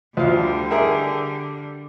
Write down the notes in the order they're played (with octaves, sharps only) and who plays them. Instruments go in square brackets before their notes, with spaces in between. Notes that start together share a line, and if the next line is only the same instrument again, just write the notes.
[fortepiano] D2 F3 F5 [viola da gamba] D3 G3
[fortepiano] G#4 A#4 E5